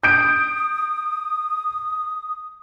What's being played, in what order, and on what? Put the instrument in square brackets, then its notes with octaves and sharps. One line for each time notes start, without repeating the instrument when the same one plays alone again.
[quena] D#6 [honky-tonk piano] G6 D7